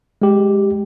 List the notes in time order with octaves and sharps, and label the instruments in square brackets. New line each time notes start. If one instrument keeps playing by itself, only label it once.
[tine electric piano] G#3 G4